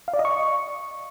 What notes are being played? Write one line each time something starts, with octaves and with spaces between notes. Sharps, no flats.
F5
D5
D#5
C#6